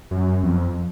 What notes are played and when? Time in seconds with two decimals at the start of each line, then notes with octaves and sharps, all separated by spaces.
0.11 F#2
0.43 F2